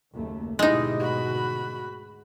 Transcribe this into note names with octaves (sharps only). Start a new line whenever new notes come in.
F#1 D#2 A3
G#1 D2 B2 G#3 D#4 E4 G4
F#4 B5